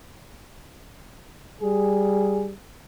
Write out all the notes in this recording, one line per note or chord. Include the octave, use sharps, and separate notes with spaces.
G3 G#4